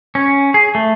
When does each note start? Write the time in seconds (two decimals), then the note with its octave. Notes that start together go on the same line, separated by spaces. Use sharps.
0.15 C#4
0.54 G#4
0.75 A3